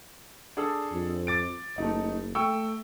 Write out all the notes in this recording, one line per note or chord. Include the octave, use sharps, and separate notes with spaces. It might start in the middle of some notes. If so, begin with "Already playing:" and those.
D4 G#4 A4
F2
D6 A6 D7
F#1 A3 D#4
A3 G5 C#6 E6